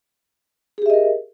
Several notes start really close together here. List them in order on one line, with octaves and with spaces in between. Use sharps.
G#4 G4 E5 D#5 A#4